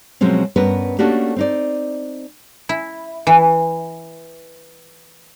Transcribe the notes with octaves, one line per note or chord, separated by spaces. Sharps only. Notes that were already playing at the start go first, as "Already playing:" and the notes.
B2 F3 F#3 G#3 C4 C#4
G2 B3 C#4 A#4 B4
A3 A#3 C#4 D4 F#4 G4
C4 D#4 D5
E4
E3